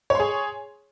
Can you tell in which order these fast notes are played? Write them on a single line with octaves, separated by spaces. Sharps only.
C#5 C6 G#4